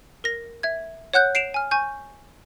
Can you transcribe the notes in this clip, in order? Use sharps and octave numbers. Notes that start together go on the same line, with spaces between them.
A#4 A#6
E5 G#6
C#5 F#5 F#6 G6
C7 D7 E7 F7
G#5 F6
G#5 C#6 G6